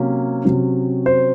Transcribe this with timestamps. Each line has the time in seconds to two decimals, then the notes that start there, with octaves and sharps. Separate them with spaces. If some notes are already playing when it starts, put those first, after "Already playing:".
Already playing: C3 F#3 A#3 C#4
0.45 C3 F#3 C#4
1.06 C5